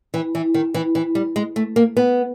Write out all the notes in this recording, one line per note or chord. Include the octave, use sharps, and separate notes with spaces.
E3
E3
D#3
E3
E3
G3
G#3
A3
A#3
B3